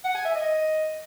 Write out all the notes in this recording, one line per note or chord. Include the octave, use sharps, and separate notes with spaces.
F#5
G#5
E5
D#5